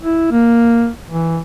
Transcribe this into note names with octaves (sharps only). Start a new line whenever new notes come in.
E4
A#3
E3